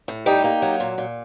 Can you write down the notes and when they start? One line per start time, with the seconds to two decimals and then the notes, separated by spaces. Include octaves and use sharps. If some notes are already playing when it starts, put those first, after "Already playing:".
0.08 A2
0.26 G3 D#4 G4
0.44 A#3
0.62 F#3
0.80 A#2
0.98 A#2